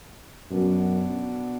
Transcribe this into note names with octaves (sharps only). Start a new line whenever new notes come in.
F#2 B2 B3 D4